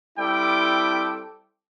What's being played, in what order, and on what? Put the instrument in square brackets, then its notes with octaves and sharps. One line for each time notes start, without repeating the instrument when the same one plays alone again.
[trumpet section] G3 C4 E4 A4 G5 D6